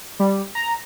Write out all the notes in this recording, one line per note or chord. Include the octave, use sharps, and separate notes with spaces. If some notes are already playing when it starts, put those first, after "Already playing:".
G3
A#5